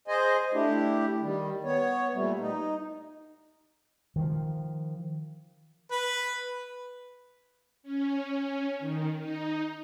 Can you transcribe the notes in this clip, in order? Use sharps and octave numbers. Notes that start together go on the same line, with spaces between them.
G#4 C5 D#5 G#5
A3 D4 E4 G4
D#3 G3
B3 C#5
A#2 G3 A3
D#4
D#3 F3
B4
C#4
D#3
D#4